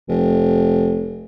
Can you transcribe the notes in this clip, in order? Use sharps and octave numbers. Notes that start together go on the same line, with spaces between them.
F1